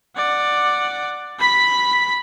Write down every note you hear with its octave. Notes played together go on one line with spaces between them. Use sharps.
D5 F#5
B5 B6